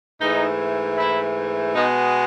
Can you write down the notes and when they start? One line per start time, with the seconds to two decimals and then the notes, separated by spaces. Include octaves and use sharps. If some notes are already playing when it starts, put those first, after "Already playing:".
0.21 G#2 E3 A3 D#4
0.98 E4
1.74 B2 G#3 B3 D#4